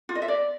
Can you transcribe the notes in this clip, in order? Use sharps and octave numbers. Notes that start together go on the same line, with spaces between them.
F4
D#5
E5
D5